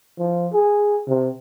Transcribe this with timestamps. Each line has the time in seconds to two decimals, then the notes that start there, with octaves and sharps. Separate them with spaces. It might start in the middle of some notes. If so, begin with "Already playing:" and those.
0.18 F3
0.54 G#4
1.08 C3